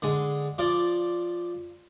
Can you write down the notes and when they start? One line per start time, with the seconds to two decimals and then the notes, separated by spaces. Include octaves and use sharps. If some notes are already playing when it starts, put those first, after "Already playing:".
0.02 D3 G#3 G#5
0.58 F3 F4 D5